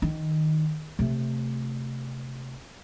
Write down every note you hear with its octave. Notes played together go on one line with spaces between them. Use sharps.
D#3
C3 A3